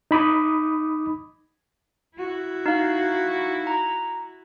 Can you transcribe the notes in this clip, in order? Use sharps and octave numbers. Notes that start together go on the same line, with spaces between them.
D#4 B5 D6 D#6
E4 F#4
D#4 F5
A#5